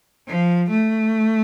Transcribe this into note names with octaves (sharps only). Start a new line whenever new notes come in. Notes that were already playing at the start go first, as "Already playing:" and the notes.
F3
A3